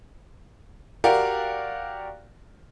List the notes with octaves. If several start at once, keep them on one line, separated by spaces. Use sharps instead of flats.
F#4 G4 A#4 D5 F5 G5